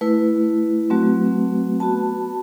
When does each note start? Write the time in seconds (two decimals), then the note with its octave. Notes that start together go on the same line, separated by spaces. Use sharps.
0.01 A3 E4 B4
0.90 F#3 A3 C4 F#4
1.80 B3 F#4 A5